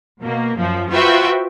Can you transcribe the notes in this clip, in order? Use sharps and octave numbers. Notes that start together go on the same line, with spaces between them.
B2 A#3
F#2 F3
F4 F#4 B4 C5 E5 G5